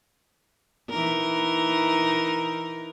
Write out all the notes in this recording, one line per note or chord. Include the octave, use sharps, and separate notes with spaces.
E3 D#4 A#4